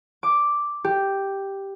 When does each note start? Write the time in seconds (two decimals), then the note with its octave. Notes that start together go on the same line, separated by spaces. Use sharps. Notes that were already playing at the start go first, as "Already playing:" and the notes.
0.23 D6
0.84 G4